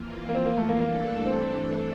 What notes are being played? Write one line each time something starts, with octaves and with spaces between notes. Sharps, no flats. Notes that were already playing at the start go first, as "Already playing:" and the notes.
Already playing: F2 E3 A#3 F4
A#3
C4
A#3
A3
A#3
G2 E3 A3 A#3 D4 A4
C4